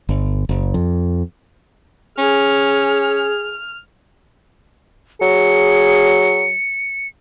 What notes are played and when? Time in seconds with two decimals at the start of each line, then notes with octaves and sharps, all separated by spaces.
0.09 G1
0.49 F#1
0.74 F2
2.18 C#4 G#4 F6
5.21 F#3 G#4 C#7